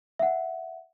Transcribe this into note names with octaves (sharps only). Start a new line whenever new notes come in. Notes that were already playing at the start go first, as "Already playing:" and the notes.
E5 F#5